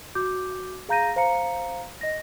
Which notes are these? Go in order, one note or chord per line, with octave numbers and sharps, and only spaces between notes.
F#4 D6 G6
G#4 F5 A#5 G6 A#6 D#7
C5 F5 A#5 C#7
D#5 A#6